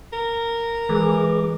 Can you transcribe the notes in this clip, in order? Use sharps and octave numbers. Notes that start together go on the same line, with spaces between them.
A#4
E3 G#3 G#4 D6